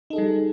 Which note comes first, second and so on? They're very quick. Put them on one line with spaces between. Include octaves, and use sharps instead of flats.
D#4 A4 G#4 G3